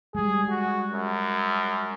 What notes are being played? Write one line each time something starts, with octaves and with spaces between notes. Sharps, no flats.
G3 G#3 G#4
F#4
F#2